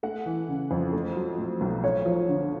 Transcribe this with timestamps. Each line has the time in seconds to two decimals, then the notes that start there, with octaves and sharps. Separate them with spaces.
0.03 A3 F#5
0.26 E3
0.49 C#3
0.71 F2
0.93 A3
1.16 F#3
1.38 A2
1.61 B1
1.83 A3 C#5
2.06 F3
2.28 D3